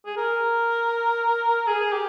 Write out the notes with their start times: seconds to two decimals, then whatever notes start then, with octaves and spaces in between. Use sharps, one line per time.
0.06 G#4
0.17 A#4
1.67 G#4
1.92 G4